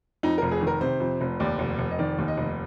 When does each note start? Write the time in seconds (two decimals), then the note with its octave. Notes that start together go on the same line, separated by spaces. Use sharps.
0.23 F2 D#4
0.38 F1 A#4
0.51 G#4
0.61 D#3
0.67 A#4
0.81 C3 C5
1.00 F2
1.21 F1
1.40 D#2 D5
1.59 F1
1.79 F1
1.91 D#5
1.99 D#3 D5
2.18 D#2
2.28 D#5
2.37 F1